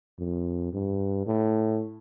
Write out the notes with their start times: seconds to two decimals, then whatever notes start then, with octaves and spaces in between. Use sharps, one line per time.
0.19 F2
0.73 G2
1.27 A2